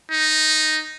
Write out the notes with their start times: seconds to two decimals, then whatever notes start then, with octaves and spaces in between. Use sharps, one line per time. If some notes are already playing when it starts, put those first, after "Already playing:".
0.11 D#4